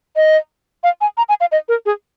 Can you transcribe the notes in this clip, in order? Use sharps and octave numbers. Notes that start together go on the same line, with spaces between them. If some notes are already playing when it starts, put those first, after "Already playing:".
D#5
F5
G#5
A#5
G#5
F5
D#5
A#4
G#4